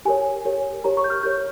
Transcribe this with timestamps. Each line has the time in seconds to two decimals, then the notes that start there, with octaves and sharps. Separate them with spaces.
0.05 G4 A#4 C#5 G#5
0.45 G4 A#4 C#5
0.84 G4 A#4 C#5 A#5
0.97 C#6
1.04 G6
1.10 F6
1.23 G4 A#4 C#5 G6